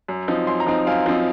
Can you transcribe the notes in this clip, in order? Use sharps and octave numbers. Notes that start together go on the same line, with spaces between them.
F#2
F3 C4 D#4
F#2 C6
A#5
F3 C4 D#4
F#2 F5
F3 C4 D#4